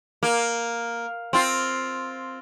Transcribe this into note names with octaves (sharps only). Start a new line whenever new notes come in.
A#3
C4 F4